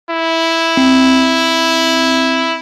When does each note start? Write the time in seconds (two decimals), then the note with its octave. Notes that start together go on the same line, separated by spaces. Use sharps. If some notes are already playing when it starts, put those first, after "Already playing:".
0.11 E4
0.77 C4